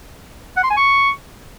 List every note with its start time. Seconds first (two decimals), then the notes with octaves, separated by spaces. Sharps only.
0.57 F#5
0.63 C6
0.70 G#5
0.77 C#6